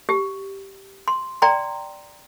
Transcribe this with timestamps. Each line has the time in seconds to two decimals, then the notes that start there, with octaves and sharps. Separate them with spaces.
0.09 G4
1.08 C6
1.42 D5 G5 A#5 C6